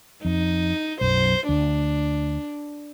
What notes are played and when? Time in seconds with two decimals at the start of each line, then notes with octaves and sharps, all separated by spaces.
0.25 F2 D#4
1.01 B1 F#2 C5
1.49 D2 D4